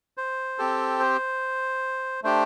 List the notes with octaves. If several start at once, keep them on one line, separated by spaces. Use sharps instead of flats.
C5
C4 G4 A4
C5
A3 D4 G4 C5